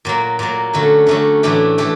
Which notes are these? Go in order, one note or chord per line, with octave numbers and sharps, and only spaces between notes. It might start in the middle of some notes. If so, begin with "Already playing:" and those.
A#2 F#3 A#3
A#2 F#3 A#3
D3 F#3 A3 C#4
D3 F#3 A3 C#4
A2 E3 A3 D4 G4
E3 A3 D4 G4